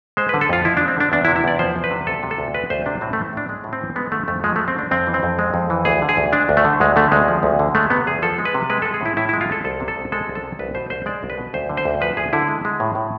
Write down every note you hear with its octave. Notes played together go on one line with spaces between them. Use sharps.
G#3 C5
B4
D3
A4
F2 F4
F3 E4
D4
G#3
C4
D3 D4
E2 D4
E4
C3
E4
E2 D5
F3 C5
E2
B4
C3
D2 A4
C3
A4
D2
G#3 B4
D2 C5
C3 D4
A2 C4
A3
E3
A2 D4
G#3
A2
C4
E3
G#3 B3
D3 A3
F2 A3
F3 G#3
G#3 A3
C4
D3 D4
F2 C4
E3
C4
F2
G#3
F2
E3
D2 G#4
D3
G#4
D2
G#3 D4
D2
A3
D3
D2 G#3
D3 A3
D2 G#3
F3
D2
D3
G#3 A3
C3 B3
E2 G#4
F3 A4
G#3
B4
C3
G#3 B4
A4
G#3
G#4
A2 E4
A2 E4
E4
G#3
F4
G#3 A4
C2 A4
C3
A4
C2
G#3 A4
C2
A4
C3
C2 B4
B2 C5
C2 C5
G#3 D5
C2
B4
B2
D2 C5
D3
C5
D2
F3 B4
D2 G#4
D3 E4
G#3
G#3
A2
A2